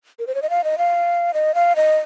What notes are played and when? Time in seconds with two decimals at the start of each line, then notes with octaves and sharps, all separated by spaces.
0.19 A#4
0.27 C5
0.35 C#5
0.42 D#5
0.50 F5
0.64 D#5
0.78 F5
1.34 D#5
1.55 F5
1.76 D#5